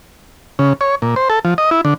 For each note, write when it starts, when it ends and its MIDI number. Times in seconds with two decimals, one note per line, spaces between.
0.59 0.73 49
0.81 0.95 73
1.02 1.15 46
1.16 1.28 72
1.30 1.39 69
1.45 1.54 53
1.58 1.70 75
1.71 1.81 64
1.85 1.94 50